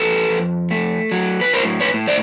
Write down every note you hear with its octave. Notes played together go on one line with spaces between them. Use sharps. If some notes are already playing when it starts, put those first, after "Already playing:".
Already playing: F2 A4 B4
F2
A3
F#3
B4
A2 A#4 C5
B4 C#5
A2
C5 D5